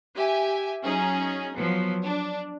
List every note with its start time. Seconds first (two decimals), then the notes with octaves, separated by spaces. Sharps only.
0.15 G4 E5 G#5
0.83 F#3 C#4 D#4 G#4
1.55 F3 F#3 B3
2.04 D4